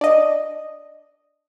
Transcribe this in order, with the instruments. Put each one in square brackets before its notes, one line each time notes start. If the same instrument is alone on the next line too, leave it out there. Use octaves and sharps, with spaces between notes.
[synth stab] D4 D#5